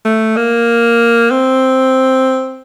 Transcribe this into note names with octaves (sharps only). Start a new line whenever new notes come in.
A3
A#3
C4